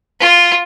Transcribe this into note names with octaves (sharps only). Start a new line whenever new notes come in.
F4